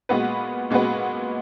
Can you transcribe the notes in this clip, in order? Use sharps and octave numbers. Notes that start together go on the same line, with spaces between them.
A#2 G#3 B3 F#4 B4
A#2 G#3 B3 F#4 B4